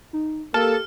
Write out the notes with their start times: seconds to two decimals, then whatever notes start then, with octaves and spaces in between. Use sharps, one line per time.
0.13 D#4
0.54 A#3 G4 A4 F6